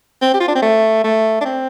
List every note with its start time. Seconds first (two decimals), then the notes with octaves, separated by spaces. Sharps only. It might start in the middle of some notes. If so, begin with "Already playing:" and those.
0.22 C4
0.34 G4
0.40 F4
0.48 D4
0.55 C4
0.62 A3
1.04 A3
1.41 D4
1.45 C4